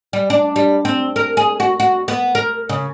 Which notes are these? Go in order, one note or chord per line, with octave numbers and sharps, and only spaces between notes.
G3
D4
G3
C4
A#4
G#4
F#4
F#4
B3
A#4
C#3